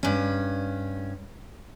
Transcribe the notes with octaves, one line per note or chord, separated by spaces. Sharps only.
G2 C#4